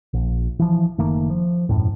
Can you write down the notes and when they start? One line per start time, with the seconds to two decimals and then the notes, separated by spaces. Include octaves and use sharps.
0.13 A#1
0.59 E3 F3
0.98 F#1 D#3 A3 A#3
1.30 F3
1.69 E1 F#2 A2